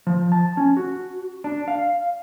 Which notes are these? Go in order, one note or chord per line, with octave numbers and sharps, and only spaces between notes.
F3
A5
C#4
F#4
D4
F5